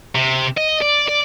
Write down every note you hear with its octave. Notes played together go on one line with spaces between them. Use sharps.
C3
D#5
D5
D5